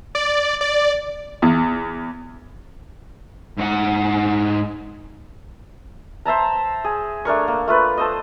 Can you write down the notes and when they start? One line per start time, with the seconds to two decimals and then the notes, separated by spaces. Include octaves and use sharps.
0.15 D5
0.61 D5
1.42 E2
3.58 G#2 F#5
6.25 C5 E5 A5 A#5
6.84 G#4
7.25 A3 D4 A#4 C#6
7.48 A#3
7.68 A3 F4 B4
7.97 A4 C5 D#5